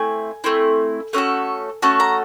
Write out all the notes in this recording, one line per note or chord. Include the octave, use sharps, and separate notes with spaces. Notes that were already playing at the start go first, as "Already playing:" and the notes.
Already playing: A3 C4 E4 G#5
A3 C4 E4
A3 C#4 F#4 A4
A3 C#4 F#4 A4 A5
A#5